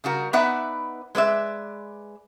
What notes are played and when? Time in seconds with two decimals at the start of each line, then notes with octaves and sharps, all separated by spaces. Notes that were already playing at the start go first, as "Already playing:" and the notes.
0.04 C#3 G3 F#4 A#4
0.33 B3 D#4 B4 D5 E5 F#5
1.15 G#3 B4 D5 E5